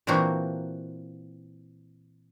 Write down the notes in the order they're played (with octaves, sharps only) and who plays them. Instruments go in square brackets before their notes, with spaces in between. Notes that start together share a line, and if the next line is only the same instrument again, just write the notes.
[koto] A#2 E3 A#3 C4 D4 F#4